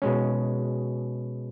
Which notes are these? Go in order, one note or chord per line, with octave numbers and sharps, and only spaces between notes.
B2 G#3 C#4